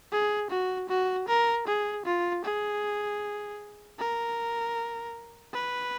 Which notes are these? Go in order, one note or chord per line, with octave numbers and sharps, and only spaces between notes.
G#4
F#4
F#4
A#4
G#4
F4
G#4
A#4
B4